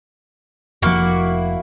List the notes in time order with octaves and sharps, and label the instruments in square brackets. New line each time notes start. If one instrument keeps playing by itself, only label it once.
[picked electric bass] F1 F3 [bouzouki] A#3 E4 F#4